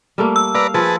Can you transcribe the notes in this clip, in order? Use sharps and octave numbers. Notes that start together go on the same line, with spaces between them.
G3 A3 A#3
E6
B4 D5 F5 A#5
F3 G#4 B4 A5